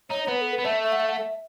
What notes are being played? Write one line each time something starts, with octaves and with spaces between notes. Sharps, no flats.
D#4 C#5
C#5
B3 B4
A4
B4
B3
A3 E5
E5
F#5
E5
F#5
E5